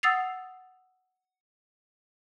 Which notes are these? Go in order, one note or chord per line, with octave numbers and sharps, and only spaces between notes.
F#5 D#6 E6 A6 C7 F7